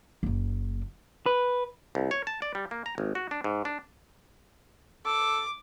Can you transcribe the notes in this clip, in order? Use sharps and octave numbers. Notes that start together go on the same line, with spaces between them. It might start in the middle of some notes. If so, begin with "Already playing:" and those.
F#1 A#3
B4
C2
C#5
A5
D5
G3
A#3
A#5
G#1
F#4
D4
G#2
D4
A4 D6